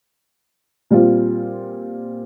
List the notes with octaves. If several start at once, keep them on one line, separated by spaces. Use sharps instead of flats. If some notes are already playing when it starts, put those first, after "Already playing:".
A#2 G3 C4 F4